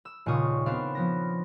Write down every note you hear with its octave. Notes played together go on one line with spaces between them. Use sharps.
E6
D#1 A#2 C#3 F4 C#6 D#6
B3 C4 D4 F5
F3 B3 A#6